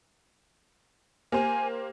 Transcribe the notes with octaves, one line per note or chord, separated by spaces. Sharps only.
A#3 G4 C5 G#5